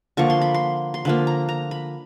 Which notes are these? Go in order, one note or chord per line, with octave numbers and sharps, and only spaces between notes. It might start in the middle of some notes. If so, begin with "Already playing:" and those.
D3 F3 A#3 C#6
C6
B5
C6
C6
D3 F3 A#3 B5
A#5
A#5
B5